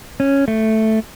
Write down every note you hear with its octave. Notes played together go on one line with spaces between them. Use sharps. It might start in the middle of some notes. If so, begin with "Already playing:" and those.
C#4
A3